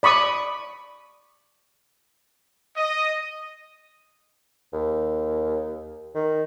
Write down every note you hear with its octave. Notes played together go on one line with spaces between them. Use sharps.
D5 B5 C#6 D#6
D#5
D#2
D#3